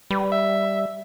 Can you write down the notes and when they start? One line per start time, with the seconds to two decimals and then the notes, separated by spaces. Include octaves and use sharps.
0.10 G3 B4
0.32 E5